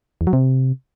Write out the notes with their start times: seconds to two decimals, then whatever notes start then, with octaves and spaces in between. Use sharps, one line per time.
0.21 E2
0.27 F#3
0.33 C3